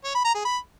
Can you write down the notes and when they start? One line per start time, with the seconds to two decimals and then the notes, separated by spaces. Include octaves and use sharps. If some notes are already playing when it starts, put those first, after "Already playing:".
0.04 C#5
0.15 B5
0.25 A#5
0.35 G#4
0.45 B5